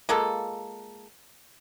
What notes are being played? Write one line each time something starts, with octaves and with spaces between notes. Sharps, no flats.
G#3 A#3 F4 A4